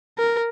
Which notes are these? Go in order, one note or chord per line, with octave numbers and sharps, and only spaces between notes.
A#4